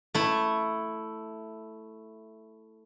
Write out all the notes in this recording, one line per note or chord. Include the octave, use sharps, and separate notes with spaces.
A3 E4